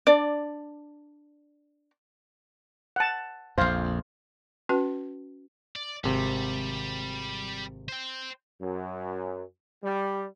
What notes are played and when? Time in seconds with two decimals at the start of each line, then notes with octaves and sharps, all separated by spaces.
0.07 D4 D5
2.96 F#5 A5
3.58 A#1 F2 C5 F5
4.69 C#4 F#4 B4 A5
5.76 D5
6.04 G#1 C3 G3
7.89 C5 G5
8.62 F#2
9.83 G3